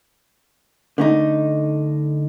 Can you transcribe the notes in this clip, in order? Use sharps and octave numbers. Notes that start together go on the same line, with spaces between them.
D3 A3 D#4